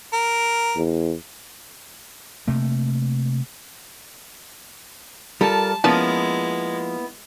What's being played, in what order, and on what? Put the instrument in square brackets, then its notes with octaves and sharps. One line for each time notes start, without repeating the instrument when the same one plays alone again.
[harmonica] A#4
[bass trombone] E2
[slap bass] C3 A3 A#3
[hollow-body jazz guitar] G3 [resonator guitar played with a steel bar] F4 A4 A#4 [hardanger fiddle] A5
[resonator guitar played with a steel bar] F3 [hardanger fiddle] G#3 [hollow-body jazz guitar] A#3 B3 E4 [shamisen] C#4 A5